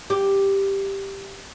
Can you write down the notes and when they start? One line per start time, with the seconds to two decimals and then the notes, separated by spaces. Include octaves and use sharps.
0.10 G4